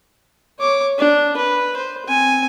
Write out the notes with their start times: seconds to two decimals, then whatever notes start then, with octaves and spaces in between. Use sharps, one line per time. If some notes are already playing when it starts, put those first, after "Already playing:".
0.59 C#5 D6
0.98 D4
1.36 B4
1.76 C5
2.06 C4 G#5